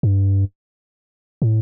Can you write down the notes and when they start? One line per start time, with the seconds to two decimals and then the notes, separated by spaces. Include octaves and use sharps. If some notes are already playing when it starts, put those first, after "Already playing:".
0.03 G2
1.42 A2